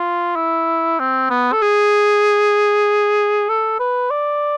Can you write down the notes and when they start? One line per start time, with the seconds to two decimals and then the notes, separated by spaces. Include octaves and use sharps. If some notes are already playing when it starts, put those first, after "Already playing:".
Already playing: F4
0.36 E4
1.00 C4
1.31 B3
1.53 A4
1.62 G#4
3.49 A4
3.80 B4
4.11 D5